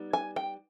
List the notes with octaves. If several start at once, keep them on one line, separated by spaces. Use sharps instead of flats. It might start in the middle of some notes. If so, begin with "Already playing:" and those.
Already playing: G3 B3 D#4
G#5
G5